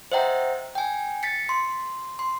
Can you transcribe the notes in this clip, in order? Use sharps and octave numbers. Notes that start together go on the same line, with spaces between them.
C5 D#5 E5 F#5 G5 A#5
G5 G#5
A6 B6 C#7
C6
C6